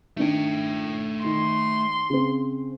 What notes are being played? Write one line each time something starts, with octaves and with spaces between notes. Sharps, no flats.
D#3 A3 D4 G5
D#3 C6
C#3 C4